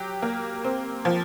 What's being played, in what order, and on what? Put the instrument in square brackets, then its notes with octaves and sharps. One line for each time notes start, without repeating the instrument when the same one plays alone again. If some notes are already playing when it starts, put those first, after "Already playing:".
Already playing: [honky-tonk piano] F#3 G4
A#3
C4
F3